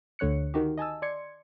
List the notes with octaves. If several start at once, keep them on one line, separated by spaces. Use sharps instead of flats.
D2 D3 C#5 F#6 C#7
D#3 D#4 F#4 G4
D#5 G#5 A5 E6
D5 C6 G#6 C#7